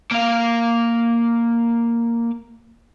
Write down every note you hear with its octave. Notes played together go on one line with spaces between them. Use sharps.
A#3 F5